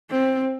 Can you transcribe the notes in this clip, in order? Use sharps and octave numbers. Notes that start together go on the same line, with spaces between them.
C4